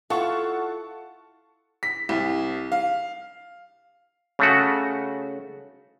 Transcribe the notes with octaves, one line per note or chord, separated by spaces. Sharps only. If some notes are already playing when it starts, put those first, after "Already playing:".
E4 F4 A4 F5 F#5 A5 C#6
B6
C2
F5
C#3 A3 F#4